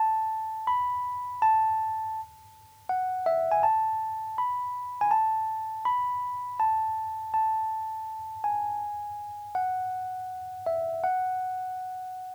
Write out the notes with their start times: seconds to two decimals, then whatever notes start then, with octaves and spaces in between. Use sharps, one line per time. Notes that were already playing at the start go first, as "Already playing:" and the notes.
Already playing: A5
0.67 B5
1.42 A5
2.89 F#5
3.26 E5
3.52 G#5
3.63 A5
4.38 B5
5.01 G#5
5.11 A5
5.85 B5
6.60 A5
7.34 A5
8.44 G#5
9.55 F#5
10.66 E5
11.04 F#5